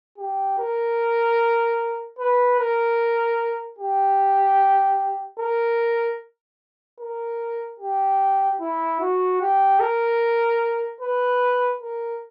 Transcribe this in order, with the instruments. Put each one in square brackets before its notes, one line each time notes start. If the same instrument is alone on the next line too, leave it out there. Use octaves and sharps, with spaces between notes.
[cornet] G4
A#4
B4
A#4
G4
A#4
A#4
G4
E4
F#4
G4
A#4
B4
A#4